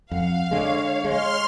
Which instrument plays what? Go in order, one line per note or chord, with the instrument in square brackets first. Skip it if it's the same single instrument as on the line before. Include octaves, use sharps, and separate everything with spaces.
[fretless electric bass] F2 [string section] F5 [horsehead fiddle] F#5
[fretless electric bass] D3 G#3 [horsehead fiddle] C#5
[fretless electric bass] G#3 [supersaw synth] C6 F6